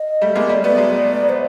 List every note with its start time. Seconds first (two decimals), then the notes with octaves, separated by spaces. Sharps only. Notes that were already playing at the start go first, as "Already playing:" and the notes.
Already playing: D#5
0.21 G3 A3
0.35 G#3 A#3
0.49 G3 A3 D5
0.63 A3 B3 D5
0.77 F#3 G#3
1.29 C5